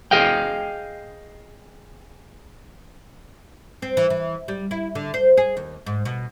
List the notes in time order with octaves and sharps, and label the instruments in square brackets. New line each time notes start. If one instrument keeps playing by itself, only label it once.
[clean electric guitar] G#4 D#5 F5 G5
[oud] C4
E3
E3
G3
E4
D3
C5
G#4
D#2
G#2
B2